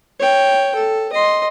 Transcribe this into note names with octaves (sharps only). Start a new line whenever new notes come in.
C#5 G5
A4
D#5 C6